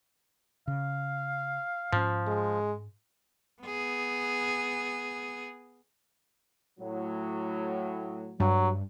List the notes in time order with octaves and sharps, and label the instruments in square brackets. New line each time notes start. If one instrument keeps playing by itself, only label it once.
[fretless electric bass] C#3 [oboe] F5
[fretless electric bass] G#2 C#4 [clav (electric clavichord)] F3
[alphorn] G#3
[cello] B3 G#4
[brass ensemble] A2 F#3
[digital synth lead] G2 [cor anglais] F#3